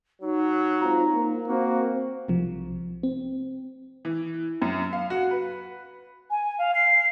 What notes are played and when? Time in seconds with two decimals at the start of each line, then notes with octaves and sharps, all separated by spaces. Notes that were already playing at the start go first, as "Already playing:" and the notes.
0.21 F#3 D#4
0.80 G#2 C4 F4 A#5
1.13 A#3
1.48 A#3 C4 F#4 C5
2.28 B1 C3 F3
3.03 C4
4.05 E3
4.62 F#2
4.93 F5
5.10 F#4
5.31 B4
6.30 G#5
6.58 F5
6.75 C7